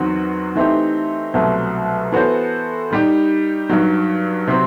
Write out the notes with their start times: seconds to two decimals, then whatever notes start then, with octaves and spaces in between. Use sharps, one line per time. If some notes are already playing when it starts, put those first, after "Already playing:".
Already playing: E2 D#3 F#3 C4 F#4
0.55 E3 A3 C4 D#4 G4
1.34 C2 B2 F#3 A3 C4
2.12 E3 B3 F#4 A4 C5
2.90 D#3 G3 D#4 G4
3.70 G2 D#3 F#3
4.47 C3 F#3 C4